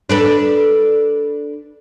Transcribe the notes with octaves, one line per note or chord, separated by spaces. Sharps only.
D4 A4 B4